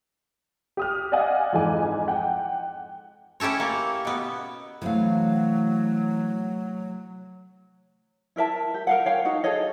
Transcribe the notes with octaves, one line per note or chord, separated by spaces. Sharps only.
G4 D#6 F6
D5 D#5 F5 F#5 G#5
F2 G#2 E3 G#5 D6
F#5 G5
C#4 E4 G4 A4 C#5
A#3
B2 B3
C3 E3 F#3 A3 F5
E4 A#4 E5 A5
G4
A#4 F5 F#5
C#5 F5 G5
D#4 F#4 F#5
G#4 A4 C#5 D#5